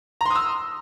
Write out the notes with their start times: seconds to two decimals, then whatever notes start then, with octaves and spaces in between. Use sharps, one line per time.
0.21 A#5
0.26 C6
0.30 D#6
0.35 E6